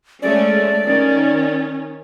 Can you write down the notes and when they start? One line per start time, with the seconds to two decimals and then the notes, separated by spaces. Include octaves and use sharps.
0.22 G#3 A3 C#4 D5
0.85 D#3 C#4